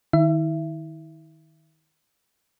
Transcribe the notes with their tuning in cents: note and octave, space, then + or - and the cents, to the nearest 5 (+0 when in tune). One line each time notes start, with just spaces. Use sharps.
D#3 +0 E4 -35 E5 +25